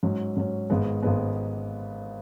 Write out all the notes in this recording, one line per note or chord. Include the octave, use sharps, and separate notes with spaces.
G#2 F#3 C#4
G#2 F#3 C#4
G#1 G#2 G#3 B3
G#1 G#2 G#3 B3